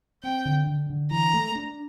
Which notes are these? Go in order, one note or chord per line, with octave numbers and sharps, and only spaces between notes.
C4 G5
D3
D3
D3
E3 A#5
A3
D4